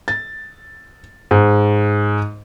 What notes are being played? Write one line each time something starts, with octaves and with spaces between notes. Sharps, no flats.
A6
G#2